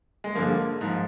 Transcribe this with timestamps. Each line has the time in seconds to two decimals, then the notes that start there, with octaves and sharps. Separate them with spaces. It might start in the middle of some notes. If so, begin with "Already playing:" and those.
0.24 G#3
0.35 G2 D3 F3 A#3
0.81 G#2 F3